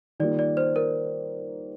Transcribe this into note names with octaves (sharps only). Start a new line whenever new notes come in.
D#3 G3 A#3 F4 D5
D5
C5
A#4